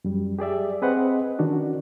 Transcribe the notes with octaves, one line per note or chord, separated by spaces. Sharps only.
F#2 G3
G4 G#4 D5 E5
C4 G#4 B4 C5 D#5 F#5
D#3 C#4 D4 F#4